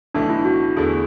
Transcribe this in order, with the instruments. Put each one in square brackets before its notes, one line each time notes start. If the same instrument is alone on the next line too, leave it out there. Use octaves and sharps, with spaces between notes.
[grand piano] B1 A2 E3 A3 [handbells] D4
[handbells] E4
F#4
[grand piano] E2 D3 A3 E4 [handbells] G#4